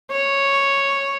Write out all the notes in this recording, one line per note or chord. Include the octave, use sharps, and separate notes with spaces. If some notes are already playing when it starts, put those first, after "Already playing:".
C#5